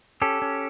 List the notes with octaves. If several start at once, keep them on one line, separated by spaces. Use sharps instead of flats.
C#4 G4 A4
C#4